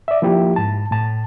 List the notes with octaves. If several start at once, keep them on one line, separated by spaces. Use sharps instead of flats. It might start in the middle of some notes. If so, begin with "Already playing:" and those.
D5 E5
F3 A#3 E4 G4
G#2 A5
A2 A5